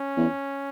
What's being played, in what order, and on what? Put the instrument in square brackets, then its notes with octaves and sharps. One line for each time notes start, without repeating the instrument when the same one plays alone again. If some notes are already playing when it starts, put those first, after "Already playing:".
Already playing: [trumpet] C#4
[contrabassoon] E2